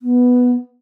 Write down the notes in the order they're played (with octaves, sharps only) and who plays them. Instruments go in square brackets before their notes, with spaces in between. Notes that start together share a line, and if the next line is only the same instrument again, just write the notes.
[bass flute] B3